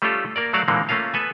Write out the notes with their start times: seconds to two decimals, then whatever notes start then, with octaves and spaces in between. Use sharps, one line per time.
0.02 G3 A3 C#4 F4 G4 A4
0.36 A#3 A#4 D5
0.53 F#3 A3 F#4 D5 F5
0.68 A#2 D3 E3 G#3 A#3 C4
0.89 A3 A#3 C#4 F4 F5
1.14 B3 A4 B4 G#5